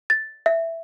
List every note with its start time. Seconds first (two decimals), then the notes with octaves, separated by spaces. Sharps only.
0.10 A6
0.46 E5